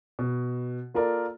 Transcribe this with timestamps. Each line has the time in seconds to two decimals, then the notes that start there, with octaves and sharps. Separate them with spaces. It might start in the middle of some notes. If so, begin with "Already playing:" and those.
0.19 B2
0.94 A#3 F4 A4 A#4 D5